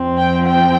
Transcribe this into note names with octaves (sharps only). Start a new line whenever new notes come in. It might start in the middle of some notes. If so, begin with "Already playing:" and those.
Already playing: F2 F3 C4
G5
G5